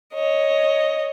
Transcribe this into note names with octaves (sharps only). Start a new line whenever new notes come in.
C#5 D#5